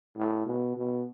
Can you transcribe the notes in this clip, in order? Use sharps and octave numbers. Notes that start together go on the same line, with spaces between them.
A2
B2
B2